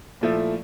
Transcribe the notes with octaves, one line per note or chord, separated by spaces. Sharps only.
A#2 F3 A3 E4